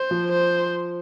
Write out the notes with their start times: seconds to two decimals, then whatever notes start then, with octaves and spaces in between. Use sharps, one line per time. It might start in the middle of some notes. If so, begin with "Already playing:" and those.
Already playing: C5
0.11 F3
0.31 C5